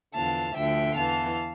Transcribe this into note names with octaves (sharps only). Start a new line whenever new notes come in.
E2 D3 F3 F5 A5
D2 D3 F3 E5 G5
E2 E3 F5 A5